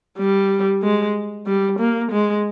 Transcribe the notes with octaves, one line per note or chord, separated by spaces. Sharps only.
G3
G#3
G3
A#3
G#3